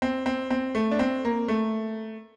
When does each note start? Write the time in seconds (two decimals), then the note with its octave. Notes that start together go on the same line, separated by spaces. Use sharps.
0.02 C4
0.26 C4
0.50 C4
0.75 A3
0.91 D4
0.99 C4
1.25 A#3
1.48 A3